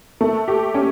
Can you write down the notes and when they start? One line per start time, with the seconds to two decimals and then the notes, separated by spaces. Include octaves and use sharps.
0.21 A3
0.48 G4
0.74 C#4